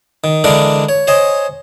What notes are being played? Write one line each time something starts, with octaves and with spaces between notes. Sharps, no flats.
D#3
D3 E3 G#3 D4 A#4 D6
C#5
C5 C#5 D#5 G#5